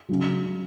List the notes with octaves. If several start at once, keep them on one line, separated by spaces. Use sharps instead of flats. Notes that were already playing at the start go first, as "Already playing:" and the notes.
C#3 F#3